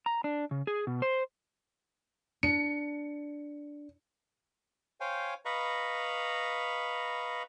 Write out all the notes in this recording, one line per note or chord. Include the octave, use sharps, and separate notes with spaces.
A#5
D4
C#3
G#4
B2
C5
D4 C#7
C5 C#5 F5 G5 G#5
B4 D#5 F5 A#5 B5 C#6